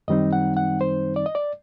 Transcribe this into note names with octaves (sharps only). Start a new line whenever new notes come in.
F#2 D#3 G3 C4 D#4 D#5
F#5
F#5
C5
D5
D#5
D5